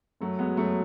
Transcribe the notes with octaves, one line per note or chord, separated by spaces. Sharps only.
F#2 F#3 A3
G#3 B3
F#2 F#3 A3